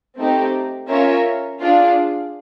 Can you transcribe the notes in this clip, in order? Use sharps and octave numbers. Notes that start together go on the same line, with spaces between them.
A3 C4 D#4 G4
C#4 F4 A#4 C#5 E5
D4 F4 G#4